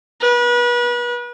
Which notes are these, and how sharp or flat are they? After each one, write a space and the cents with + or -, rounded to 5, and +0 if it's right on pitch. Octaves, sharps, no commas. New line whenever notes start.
B4 -35